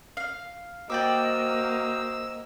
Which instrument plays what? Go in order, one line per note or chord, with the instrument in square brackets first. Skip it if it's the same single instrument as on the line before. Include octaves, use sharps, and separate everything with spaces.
[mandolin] F5
[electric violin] A#3 [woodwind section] F#4 C5 D#5 [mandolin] D5 G5 D6 [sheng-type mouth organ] E6